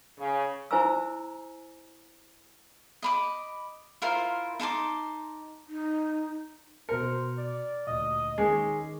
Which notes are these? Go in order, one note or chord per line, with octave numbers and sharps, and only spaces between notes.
C#3
E4 C5 G#5 A#5 E6
D#5 B5 D6
E4 F4 A#4 C5
D#4 A5 C6 D6
D#4
B2 A#4 C5 C#7
D5
D2 A#2 D#5
D#3 G#3 C#4 D6 C7